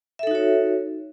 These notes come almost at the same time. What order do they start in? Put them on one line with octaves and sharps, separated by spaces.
E5 A4 D#4 F#4 C#5